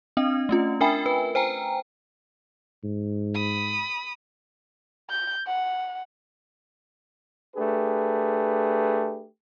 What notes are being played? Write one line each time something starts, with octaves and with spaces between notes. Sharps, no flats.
C4 D4 D#5
A3 C#4 F4
D4 A#4 E5 G5 G#5 B5
B4
C5 G5 G#5 A#5
G#2
B5 D#6
G6
F#5
A3 D4 G4 G#4 B4